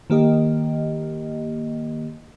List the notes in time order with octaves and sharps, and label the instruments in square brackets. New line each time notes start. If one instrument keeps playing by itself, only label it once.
[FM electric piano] D#3 A#3 G4 D#5